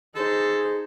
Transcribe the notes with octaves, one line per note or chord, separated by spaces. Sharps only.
D#4 G#4 A4 C5